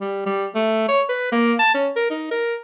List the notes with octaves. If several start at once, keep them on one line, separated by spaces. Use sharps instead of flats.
G3
G3
A3
C#5
B4
A#3
A5
C#4
A#4
D#4
A#4